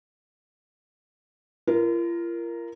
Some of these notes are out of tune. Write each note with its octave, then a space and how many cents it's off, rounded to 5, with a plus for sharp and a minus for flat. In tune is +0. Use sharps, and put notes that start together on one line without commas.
F4 -40 A#4 +0